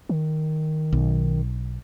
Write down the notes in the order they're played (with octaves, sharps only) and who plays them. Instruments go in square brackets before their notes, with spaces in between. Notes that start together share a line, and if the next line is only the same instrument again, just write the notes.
[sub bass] D#3
[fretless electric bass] B1